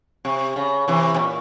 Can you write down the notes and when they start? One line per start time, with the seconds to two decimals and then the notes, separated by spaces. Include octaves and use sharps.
0.25 C3
0.56 C#3
0.88 C3 E3
1.14 C3
1.19 A#2